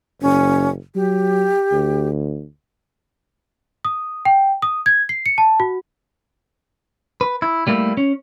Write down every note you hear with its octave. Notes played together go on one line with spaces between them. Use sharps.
F#1 C#4
F#3 G4
D2
D#6
G5
D#6
G#6
C7
C#7
A5
F#4
B4
E4
G3 A3 A#3 E4
C#4